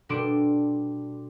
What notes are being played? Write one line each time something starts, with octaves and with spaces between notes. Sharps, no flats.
B2 G3 D4 A4 C6 D7